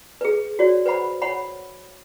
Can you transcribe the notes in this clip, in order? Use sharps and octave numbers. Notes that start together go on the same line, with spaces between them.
G#4 B4
F#4 C#5 D5
B4 C5 F#5 B5
C#5 F#5 B5